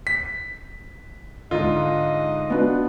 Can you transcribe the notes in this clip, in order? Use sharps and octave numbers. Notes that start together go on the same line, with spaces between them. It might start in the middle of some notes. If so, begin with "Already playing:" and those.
B6
G#2 D3 F4 D#5
B3 D4 F#4